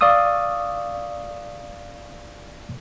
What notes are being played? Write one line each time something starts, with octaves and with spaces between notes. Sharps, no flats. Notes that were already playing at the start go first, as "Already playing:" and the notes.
D5 F5 C#6 D#6 E6